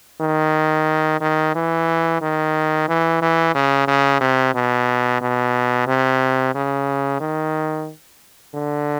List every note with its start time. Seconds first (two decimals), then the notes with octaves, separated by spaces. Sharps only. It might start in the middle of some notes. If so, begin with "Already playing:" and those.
0.21 D#3
1.21 D#3
1.55 E3
2.22 D#3
2.88 E3
3.22 E3
3.55 C#3
3.87 C#3
4.21 C3
4.54 B2
5.21 B2
5.87 C3
6.55 C#3
7.21 D#3
8.54 D3